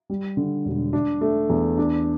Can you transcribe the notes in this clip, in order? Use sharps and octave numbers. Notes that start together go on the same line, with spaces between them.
G3
D3
E1
D4
A3
E2
D4